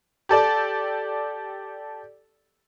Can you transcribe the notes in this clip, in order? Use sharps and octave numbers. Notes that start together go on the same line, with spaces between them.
G4 A4 D5 A5